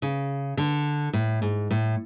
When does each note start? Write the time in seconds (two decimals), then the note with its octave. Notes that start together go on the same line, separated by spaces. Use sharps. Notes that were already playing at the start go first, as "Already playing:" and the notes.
0.02 C#3
0.57 D3
1.13 A2
1.42 G#2
1.71 A2